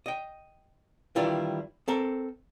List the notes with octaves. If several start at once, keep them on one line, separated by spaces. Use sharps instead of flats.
D#5 G5
D#3 E3 G3 D4 E4 F4
C4 A4 A#4